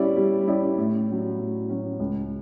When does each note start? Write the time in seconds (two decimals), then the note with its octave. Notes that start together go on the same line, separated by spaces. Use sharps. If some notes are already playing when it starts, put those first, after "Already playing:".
Already playing: G3 C#4 E4 G4 D5
0.17 G3
0.47 C#4 E4 G4 D5
0.78 A2
1.08 F#3 C#4
1.39 A2
1.69 F#3 C#4
2.00 C#2